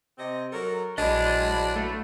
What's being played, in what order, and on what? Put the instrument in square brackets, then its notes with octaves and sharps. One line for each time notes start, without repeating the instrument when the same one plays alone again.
[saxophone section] C3 C4 D#5
F#3 A4 A#4
[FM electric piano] A#1 B5 [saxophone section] D3 E3 F#3 [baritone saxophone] D4 [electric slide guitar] G#4 D#5
[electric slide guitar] A3